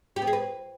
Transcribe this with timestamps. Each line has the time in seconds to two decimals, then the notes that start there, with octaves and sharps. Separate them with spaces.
0.16 G4
0.22 B3
0.27 G#4
0.33 B4